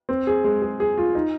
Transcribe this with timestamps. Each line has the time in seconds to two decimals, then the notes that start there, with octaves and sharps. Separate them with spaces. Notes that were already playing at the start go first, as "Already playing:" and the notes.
0.09 C4
0.27 G#4
0.44 G#3
0.62 G#4
0.80 G#4
0.98 F4
1.15 D#4